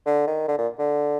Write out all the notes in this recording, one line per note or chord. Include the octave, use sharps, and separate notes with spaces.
D3
D#3
D3
A#2
D3